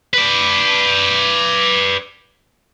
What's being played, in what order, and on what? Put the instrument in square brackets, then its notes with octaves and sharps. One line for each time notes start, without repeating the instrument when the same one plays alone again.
[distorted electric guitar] B4 D5